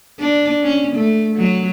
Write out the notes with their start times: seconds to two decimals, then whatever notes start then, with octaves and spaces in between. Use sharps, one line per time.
0.20 D4
0.64 C#4
0.96 A3
1.36 F#3